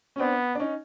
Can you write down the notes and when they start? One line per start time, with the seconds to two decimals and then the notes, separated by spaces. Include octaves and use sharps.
0.16 C#4
0.19 B3 C4 D4
0.55 D4
0.60 C#4 D#4